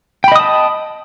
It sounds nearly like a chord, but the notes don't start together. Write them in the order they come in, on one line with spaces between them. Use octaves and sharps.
G5 B5 D#5 D#6 A5